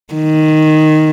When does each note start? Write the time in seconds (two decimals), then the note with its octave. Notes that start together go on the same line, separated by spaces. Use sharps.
0.14 D#3